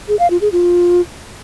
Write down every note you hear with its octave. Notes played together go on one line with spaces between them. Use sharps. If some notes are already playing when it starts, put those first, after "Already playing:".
G#4
F5
F4
G#4
F4